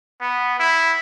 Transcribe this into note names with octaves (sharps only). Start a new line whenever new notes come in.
B3
E4